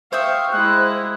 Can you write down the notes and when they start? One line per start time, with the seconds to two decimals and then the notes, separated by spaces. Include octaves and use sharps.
0.13 C5 E5 F5 G5 C#6 D#6
0.52 G#3 E4 F#6